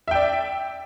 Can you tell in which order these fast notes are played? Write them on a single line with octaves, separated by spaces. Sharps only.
E5 G5 D5